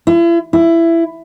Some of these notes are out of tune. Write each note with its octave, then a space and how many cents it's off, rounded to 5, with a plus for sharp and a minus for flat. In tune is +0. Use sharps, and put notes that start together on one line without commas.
E4 +40
E4 +15